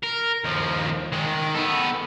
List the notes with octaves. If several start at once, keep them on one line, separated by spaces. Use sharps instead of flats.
A#4
D#2 F3
D#3 G#3
D#3
B3 A4